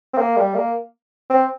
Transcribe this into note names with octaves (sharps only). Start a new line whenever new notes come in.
C4
A#3
G3
A#3
C4